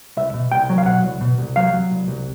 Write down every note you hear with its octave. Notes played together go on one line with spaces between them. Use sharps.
C2 E5
B2
C2 G5
F#3
F5
B2 F#5
C2
B2
C2
F#3 F5
F#3
C2
C2